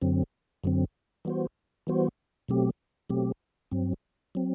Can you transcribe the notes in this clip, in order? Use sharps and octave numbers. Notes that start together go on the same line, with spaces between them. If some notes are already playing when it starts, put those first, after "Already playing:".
F#2 D3 F#3 C4
F#2 D3 F#3 C4
E3 G3 B3 F#4 C5
E3 G3 B3 F#4 C5
B2 F#3 A3 C4 G4
B2 F#3 A3 C4 G4
G2 F#3 C4
F#3 C4